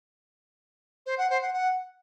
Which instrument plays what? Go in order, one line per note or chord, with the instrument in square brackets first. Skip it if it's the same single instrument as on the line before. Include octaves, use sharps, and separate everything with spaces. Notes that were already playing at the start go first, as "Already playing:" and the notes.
[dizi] C5
F#5
C5
F#5
F#5